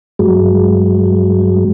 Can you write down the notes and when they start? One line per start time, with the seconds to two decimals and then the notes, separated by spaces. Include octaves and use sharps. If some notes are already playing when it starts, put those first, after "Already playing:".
0.19 G2 F#3 G#3